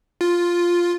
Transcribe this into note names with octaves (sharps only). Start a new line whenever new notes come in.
F4